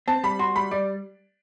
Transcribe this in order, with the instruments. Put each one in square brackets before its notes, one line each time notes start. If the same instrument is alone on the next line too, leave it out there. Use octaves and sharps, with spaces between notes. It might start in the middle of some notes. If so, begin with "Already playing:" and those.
[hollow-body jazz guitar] C4 [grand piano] A5
[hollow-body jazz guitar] G3 [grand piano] B5
[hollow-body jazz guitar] F#4 [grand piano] C6
[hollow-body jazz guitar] G3 [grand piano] B5
[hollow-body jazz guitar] G3 [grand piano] D5